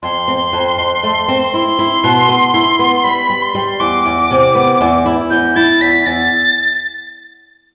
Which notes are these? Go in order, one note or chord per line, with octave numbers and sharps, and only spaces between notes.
F2 C6
C4
F2
F2
A3
C4
E4 C6
E4
B2
B3
E4
B3
G3 B5
G3
C6
G3
E2 D6
E2
C3
B3
E2
E4
E2 G6
E4 A6
E2 B6
E2 A6